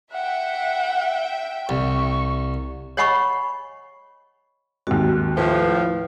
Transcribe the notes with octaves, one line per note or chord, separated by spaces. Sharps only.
E5 F#5 G5
C2 C#6
C#5 D#5 F#5 G#5 B5 C#6
G#1 D#2 F#4
A2 F3 B4